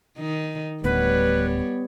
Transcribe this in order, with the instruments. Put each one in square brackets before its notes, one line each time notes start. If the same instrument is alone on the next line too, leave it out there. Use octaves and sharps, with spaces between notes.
[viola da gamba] D#3 D#4
[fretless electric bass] D1 D2 [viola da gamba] G3 C#5 [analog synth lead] B3 [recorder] B4